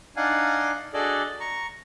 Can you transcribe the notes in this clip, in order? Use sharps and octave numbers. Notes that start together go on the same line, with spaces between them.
D4 D#4 F5 F#5 G#5
D4 F#4 G#4 A4 D5 D#5
A#5 C#6